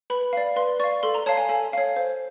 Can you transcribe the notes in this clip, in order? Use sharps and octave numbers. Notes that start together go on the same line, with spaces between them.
B4 B5
D5 F5
B4 C6
D5 F5 C#6
A4 C6
A#5
C#5 F5 A5
G#5
A4 G#5
C#5 F5
C5